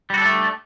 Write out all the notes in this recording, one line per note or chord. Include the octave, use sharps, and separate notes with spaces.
G3 A3 D4 F#4 A4